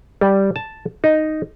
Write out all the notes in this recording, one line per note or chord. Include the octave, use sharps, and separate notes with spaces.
G3
A5
D#4